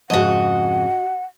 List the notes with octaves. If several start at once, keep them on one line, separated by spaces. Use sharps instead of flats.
F2 G#2 C#3 F#4 D#5 F#5